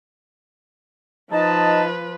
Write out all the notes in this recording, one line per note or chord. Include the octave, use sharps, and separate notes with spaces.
F3 D#4 B4 D#5 A5